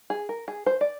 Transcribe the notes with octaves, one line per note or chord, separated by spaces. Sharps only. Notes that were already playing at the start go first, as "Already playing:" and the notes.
G#4
A#4
G#4
C5
D5